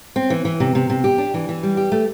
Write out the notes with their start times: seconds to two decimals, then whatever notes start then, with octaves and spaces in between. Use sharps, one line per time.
0.16 C4
0.30 E3
0.45 E3
0.60 C3
0.75 C3
0.90 C3
1.04 G4
1.18 D4
1.34 E3
1.49 E3
1.63 G3
1.77 G4
1.92 A3